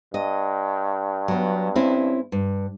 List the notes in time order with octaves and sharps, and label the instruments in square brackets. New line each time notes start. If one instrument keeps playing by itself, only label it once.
[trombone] G2 [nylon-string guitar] D#5
[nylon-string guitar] F#3 B3
C4 C#4 E4
G2